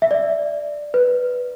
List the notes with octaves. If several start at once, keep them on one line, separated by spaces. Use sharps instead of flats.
E5
D5
B4